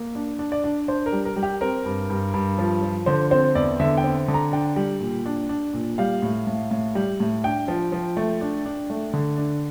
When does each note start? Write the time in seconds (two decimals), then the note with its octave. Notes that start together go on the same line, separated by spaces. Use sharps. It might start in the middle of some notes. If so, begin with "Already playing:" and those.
Already playing: A#3
0.15 D4
0.39 D4
0.52 D5
0.64 D4
0.88 D4 C5
1.06 A#4
1.12 G3
1.25 A#4
1.36 G3
1.43 G4
1.61 C4 A#4
1.85 G2
2.10 G2
2.34 G2
2.58 F3
2.82 F3
3.06 D3 C5
3.31 C4 C5
3.55 E2 D5
3.80 D3 E5
3.97 G5
4.04 C4
4.28 D3
4.34 A#5
4.52 D4 G5
4.76 G3
5.01 A#2
5.26 D4
5.49 D4
5.74 A#2
5.98 G3 F5
6.22 A2
6.47 A2
6.71 A2
6.95 G3
7.20 A2
7.44 D4 G5
7.68 F3
7.92 F3
8.17 A3
8.41 D4
8.66 D4
8.90 A3
9.13 D3
9.38 D4